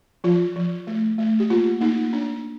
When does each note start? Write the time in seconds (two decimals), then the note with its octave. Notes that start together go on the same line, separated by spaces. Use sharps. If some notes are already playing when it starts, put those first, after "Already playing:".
0.24 F3 F4
0.56 F3
0.87 A3
1.18 A3
1.40 G4
1.50 A#3 F4
1.81 A#3 D#4
2.13 D4